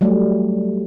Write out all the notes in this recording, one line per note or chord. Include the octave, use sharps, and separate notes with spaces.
F#3 G3 A3